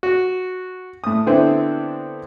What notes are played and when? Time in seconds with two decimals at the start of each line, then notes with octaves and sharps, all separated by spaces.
0.03 F#4
1.04 A2 D#6
1.26 D3 B3 C4 D4 E4